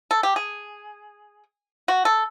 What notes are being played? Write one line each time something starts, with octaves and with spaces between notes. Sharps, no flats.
A4
G4
G#4
F#4
A4